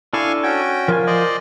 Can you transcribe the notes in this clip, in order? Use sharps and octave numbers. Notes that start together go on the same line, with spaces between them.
D4 E4 A4 D5 F5 G#5 C#6
C#4 F#4 G5 G#6
F3 F4 A#4 G#5
C5 D5 D#5